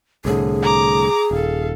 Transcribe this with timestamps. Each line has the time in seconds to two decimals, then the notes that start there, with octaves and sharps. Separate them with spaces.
0.25 C2 A2 D3 G#4
0.63 A#5 D6
1.31 D#1 A4 F5